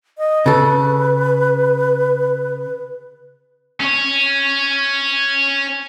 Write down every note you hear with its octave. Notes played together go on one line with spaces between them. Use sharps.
D#5
C#3 A4 B4
C#4 C#5